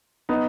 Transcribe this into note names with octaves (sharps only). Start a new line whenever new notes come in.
B3 D#4